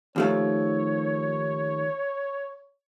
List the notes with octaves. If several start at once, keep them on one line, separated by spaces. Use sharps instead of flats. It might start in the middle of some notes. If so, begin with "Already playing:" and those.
D#2 F3 A3 C#5